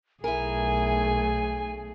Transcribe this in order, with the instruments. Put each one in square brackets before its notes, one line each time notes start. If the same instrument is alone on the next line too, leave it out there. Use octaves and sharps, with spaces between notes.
[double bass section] B1 A3 [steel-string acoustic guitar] E4 A#4 [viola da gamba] G#4 [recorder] G#5